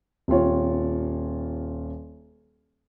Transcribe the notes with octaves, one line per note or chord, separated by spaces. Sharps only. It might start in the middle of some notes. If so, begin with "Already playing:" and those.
D#1 C4 F4 C#5